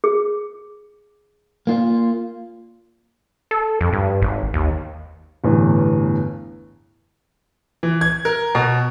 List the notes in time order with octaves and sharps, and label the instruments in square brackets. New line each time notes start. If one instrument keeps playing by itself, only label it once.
[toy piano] G#4
[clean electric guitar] A#3 F4
[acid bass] A4
F2
G2
G#1
D#2
[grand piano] G1 E2 A2 E3
E3
G#6
A#4
B2